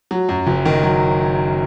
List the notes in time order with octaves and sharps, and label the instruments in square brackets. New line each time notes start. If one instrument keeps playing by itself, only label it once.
[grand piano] F#3
F#2
F#1
D#3
F#3